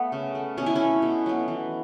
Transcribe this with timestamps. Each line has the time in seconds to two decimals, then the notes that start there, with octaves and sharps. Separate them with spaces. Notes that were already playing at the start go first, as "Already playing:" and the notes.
Already playing: A3 B3
0.12 C#3
0.35 A3
0.57 B2 C#4
0.66 E4
0.76 A3 C#4
1.02 B2
1.26 F#3 B3
1.48 E3